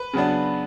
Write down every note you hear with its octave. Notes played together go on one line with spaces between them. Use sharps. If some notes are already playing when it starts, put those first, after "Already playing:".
Already playing: B4
C#3 F#3 B3 D4